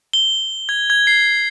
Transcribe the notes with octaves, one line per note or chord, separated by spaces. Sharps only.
G7
G#6
G#6
C7